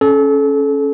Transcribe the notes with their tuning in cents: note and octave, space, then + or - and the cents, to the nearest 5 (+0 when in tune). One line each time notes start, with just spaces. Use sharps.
C#4 +0 A4 -30